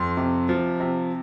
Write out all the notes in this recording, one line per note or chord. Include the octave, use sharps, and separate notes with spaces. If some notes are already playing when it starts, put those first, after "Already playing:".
Already playing: F2 C6
C3
F3
C3